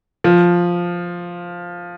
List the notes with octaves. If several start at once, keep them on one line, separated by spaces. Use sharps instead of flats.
F3